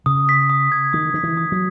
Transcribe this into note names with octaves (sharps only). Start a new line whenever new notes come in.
C#3 D#6
B6
D#6
G#6
D#3 D#6
D#3 B6
E3
D#6
F#3